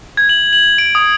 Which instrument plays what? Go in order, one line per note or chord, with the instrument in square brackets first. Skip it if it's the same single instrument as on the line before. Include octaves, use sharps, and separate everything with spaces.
[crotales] G#6
F#7
F#7
D7
D#6